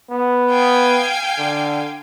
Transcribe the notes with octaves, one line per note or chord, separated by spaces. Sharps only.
B3
F5 G5 G#5
D3